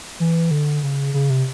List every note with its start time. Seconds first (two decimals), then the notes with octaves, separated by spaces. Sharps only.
0.20 E3
0.51 D3
0.83 C#3
1.14 C#3
1.30 C3